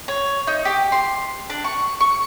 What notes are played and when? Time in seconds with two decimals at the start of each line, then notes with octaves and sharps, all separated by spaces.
0.08 C#5
0.47 D#4
0.65 G4
0.92 C6
1.50 D4
1.64 C#6
2.01 C#6